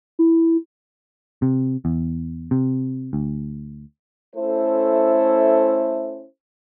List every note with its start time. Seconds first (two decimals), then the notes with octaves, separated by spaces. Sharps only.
0.19 E4
1.42 C3
1.85 E2
2.51 C3
3.13 D2
4.36 A3 C#4 E4 A4 C5